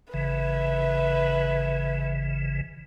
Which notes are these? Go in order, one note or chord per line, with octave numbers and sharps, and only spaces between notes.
G#1 C#3 E3 B4 E5